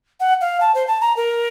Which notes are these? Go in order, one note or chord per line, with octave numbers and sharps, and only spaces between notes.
F#5
F5
A5
C5
A5
A#5
A#4